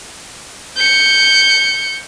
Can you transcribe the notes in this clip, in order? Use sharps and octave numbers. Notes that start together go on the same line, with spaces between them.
G6 C#7